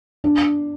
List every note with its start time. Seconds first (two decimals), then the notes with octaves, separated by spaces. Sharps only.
0.24 D4